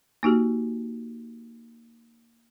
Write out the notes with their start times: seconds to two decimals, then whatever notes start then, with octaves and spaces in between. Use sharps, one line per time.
0.23 A#3 D#4 F#4 G4